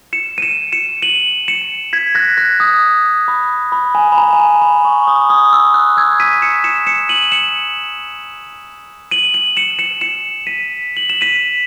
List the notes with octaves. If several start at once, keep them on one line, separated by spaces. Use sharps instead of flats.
C#7 E7
D#7
C#7 E7
C#7 E7
D#7 F#7
C#7 E7
G#6 B6
F#6 A#6
F#6 A#6
D#6
B5
B5
G#5
B5
A#5
G#5
A#5
B5
C#6
D#6
D#6
E6
F#6
E6 G#6
B6 D#7
C#7 E7
C#7 E7
C#7 E7
D#7 F#7
C#7 E7
D#7 F#7
D#7 F#7
C#7 E7
C#7 E7
C#7 E7
B6 D#7
F#7
E7
B6 D#7